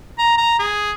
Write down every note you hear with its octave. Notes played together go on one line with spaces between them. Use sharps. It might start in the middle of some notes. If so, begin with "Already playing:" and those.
A#5
A#5
G#4